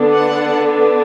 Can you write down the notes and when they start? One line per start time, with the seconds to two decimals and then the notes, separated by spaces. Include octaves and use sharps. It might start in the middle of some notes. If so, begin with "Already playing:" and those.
Already playing: D3 B3 D4
0.13 F#5